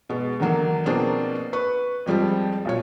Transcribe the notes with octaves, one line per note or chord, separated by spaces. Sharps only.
B2 G#3
E2 D3 D#3 F#3 A#3
B2 F3 A#3 C4 D4 G#4
B4 C#6
F2 F3 G3 G#3 C4
B1 A#2 C#5